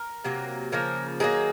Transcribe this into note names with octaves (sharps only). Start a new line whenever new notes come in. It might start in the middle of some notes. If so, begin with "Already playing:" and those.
Already playing: A#4
C3 F#3 A#3
C#3 F3 A#3 A#4
D#3 F#3 A#3 G#4